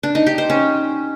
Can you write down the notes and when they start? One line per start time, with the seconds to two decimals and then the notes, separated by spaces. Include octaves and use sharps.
0.03 D4
0.15 D#4
0.26 G4
0.38 C5
0.50 C#4